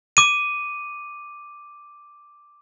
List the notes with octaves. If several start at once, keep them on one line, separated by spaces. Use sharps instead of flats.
D6 D#7